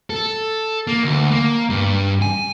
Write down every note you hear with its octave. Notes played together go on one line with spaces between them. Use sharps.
A4
A#3
D2
A#3
G2
G#5